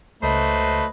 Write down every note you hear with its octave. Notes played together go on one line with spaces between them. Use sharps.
C#2 F#3 A3 B4 C5 D#5